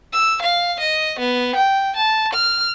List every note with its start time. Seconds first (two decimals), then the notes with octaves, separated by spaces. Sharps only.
0.12 E6
0.42 F5
0.79 D#5
1.19 B3
1.56 G5
1.96 A5
2.33 F6